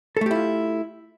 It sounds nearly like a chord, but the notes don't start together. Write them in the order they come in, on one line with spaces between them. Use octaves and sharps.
A4 A3 G4 E4 F4